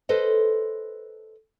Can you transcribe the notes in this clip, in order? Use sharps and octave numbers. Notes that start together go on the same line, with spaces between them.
A4 B4 C5 D#5